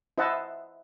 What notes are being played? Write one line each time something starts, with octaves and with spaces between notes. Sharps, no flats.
E4 C5 D#5 E5 F#5 A5